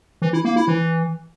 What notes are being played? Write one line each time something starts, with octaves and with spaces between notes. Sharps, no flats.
E3
E4
A#3
E4
E3